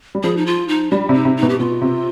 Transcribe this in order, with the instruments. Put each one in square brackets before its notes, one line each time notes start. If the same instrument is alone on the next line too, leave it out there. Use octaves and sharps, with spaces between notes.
[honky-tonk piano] G3
[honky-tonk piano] F3 [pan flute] G#4
[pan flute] D#4
F4
D#4
[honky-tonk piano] G3 [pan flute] D4
[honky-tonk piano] C3 [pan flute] D#4
[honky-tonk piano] C3
[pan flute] D#4
[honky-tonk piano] B2
[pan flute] G4
[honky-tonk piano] B2 [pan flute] F4
[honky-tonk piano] C3